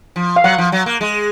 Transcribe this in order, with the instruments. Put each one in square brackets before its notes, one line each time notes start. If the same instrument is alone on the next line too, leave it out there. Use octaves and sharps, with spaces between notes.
[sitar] F3
[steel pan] F5
[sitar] F#3 [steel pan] F#5
[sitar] F3
F#3
A#3
G#3